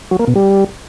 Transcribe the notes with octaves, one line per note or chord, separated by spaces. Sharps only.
F#3
A#3
B2
G3